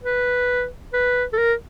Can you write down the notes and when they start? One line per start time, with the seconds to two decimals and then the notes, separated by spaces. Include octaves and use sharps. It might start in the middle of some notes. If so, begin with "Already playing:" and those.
0.03 B4
0.93 B4
1.33 A4
1.38 A#4